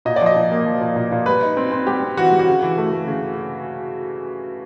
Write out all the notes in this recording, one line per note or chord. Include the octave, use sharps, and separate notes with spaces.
A#2 D#5
D5
F3 D#5
A#2
A#3
F3
A#2
A#2
A#2
G3 B4
D#4
C4
C4
G3 G4
C4
E3 F#4
G3
F#4
C#3
E3
A3
A3
C#3